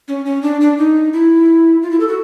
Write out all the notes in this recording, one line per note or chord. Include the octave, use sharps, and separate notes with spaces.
C#4
C#4
D4
D4
D#4
E4
F4
E4
A4
F#4